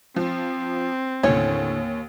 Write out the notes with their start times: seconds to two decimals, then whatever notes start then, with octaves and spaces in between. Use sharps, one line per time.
0.16 F3 C4
1.23 D#2 A2 D3 C#4 C#5